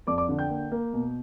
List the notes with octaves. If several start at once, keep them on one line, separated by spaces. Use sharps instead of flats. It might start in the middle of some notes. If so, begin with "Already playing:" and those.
F2 D5 D6
D5 D6
D3
G5 G6
A#3
A#3
B2